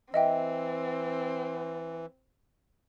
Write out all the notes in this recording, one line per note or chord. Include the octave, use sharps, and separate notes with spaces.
E3 C4 D#5 E5 G5